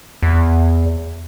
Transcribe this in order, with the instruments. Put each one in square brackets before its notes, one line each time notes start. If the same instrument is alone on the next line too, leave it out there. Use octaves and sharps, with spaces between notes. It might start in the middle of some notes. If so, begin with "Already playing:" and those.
[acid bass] E2